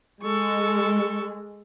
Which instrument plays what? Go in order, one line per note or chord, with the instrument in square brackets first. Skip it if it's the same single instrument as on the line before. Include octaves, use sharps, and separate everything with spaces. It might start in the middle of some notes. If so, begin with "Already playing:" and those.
[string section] G#3 [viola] A4 C#6